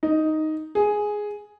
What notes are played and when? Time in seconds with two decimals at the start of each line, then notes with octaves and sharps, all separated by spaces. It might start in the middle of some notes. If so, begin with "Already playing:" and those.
0.03 D#4
0.75 G#4